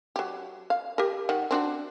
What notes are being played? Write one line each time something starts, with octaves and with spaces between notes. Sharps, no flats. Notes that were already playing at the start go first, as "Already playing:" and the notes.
F#3 G4
F5
G4 A#4
D#3 F#5
C4 D4 F#4